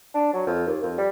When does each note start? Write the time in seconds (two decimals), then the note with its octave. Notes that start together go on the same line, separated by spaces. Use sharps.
0.14 D4
0.33 F#3
0.47 F2
0.67 D#2
0.83 F2
0.98 G3